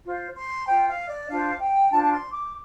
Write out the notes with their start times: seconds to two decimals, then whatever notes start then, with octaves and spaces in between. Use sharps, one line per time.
0.05 F4 C5
0.36 C6
0.67 F4 C5 G5
0.88 F5
1.09 D5
1.29 D4 F4 C5 F5
1.60 G5
1.91 D4 F4 C5 A5
2.03 A5
2.11 C6
2.32 D6